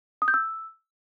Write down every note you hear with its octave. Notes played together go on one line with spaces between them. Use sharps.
D#6
G6
E6